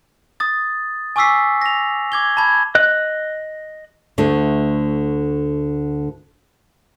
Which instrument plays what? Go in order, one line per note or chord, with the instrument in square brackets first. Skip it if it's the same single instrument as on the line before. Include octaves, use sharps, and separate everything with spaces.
[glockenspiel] D#6 A6
G#5 C#6 D6 E6 B6 C7
A#6 F7
D6 G#6 G7
A5 B5 G#6
[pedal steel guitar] D#5 F#6
[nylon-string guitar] D2 D3 A3